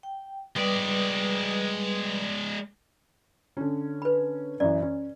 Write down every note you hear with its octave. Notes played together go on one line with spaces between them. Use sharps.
G5
G3 G#3 B4 D5 D#6
D3 C#4
B4 B5
F#2 E3 D5
C#4